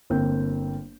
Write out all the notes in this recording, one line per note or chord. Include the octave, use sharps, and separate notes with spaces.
G1 A#3 C4 G6